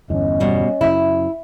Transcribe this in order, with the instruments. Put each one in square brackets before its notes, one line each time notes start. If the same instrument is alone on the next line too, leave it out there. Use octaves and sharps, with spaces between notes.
[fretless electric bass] G1 E2 [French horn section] C#4 D#5
[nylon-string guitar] B2 G3
[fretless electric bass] F#2 C#3 [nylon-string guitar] E4